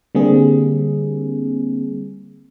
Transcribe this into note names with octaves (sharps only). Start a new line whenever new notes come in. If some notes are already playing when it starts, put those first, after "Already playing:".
D3 G3 A#3 C4 G#4